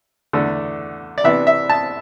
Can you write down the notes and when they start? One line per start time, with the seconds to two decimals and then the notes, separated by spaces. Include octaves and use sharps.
0.33 E2 D3 A3 D4
1.18 D5
1.24 C3 E3 B3 D4 E5
1.47 E5
1.69 A5